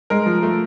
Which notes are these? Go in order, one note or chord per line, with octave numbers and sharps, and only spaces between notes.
G#3 A#4
F3
A3